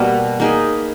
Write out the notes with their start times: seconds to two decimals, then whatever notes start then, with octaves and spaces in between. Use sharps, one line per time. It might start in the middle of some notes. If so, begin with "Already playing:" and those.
Already playing: B2 G3 A#3
0.40 A#3 D#4 G#4 B4